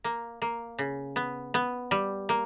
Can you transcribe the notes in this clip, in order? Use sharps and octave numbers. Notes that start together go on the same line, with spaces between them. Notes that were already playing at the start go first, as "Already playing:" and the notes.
A#3
A#3
C#3
B3
B3
G3
A#3